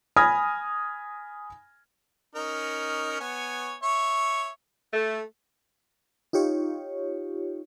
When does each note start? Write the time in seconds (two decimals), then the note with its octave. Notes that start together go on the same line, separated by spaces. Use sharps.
0.16 G#5 B5 D#6 F6 G#6 A#6
2.35 C#4 D#4 A#4
3.20 B3 C#5 G#5
3.83 C#5 E5 C#6
4.93 A3
6.33 D#4 F4 G4 C#5